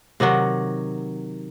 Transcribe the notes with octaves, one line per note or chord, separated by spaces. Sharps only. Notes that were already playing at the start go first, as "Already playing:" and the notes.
C3 D#3 F#3 F#4